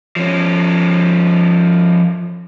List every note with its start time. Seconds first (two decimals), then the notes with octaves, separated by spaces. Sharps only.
0.16 F3 C#4